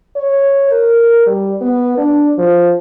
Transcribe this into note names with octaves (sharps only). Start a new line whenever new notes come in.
C#5
A#4
G3
B3
D4
F3